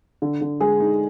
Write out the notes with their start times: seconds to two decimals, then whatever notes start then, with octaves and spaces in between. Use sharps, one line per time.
0.22 D3
0.41 D3
0.61 G#3 G#4
0.80 D#4